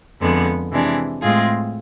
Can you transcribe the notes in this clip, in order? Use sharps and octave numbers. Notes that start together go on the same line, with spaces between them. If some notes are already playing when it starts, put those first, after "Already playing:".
F2 D3 G#3 B3
C3 E3 G#3 D4
A2 G#3 C4 F4 G#4